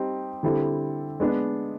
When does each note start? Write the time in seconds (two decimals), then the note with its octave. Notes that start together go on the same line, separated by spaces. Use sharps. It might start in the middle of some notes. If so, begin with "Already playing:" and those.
Already playing: G3 C4 D#4 G4
0.43 D3 G3 C4 E4 A4
1.20 G#3 B3 D4